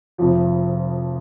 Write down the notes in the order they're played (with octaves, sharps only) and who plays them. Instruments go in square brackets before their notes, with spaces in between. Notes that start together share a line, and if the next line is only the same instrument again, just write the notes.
[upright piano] F1 F2 F3